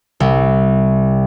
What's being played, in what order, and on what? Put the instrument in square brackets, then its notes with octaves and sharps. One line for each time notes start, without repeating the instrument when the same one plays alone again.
[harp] C2